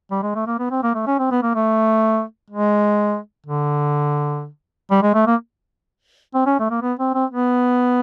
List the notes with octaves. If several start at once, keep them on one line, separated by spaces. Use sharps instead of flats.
G3
G#3
A3
A#3
B3
C4
A#3
A3
C#4
C4
B3
A#3
A3
G#3
D3
G3
G#3
A3
A#3
C4
C#4
A3
A#3
B3
C4
C4
B3